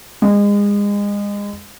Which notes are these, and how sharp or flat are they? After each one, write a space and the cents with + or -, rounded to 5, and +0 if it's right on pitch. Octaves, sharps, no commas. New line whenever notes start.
G#3 -30